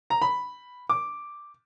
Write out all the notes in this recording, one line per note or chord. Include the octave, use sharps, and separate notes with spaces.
A#5
B5
D6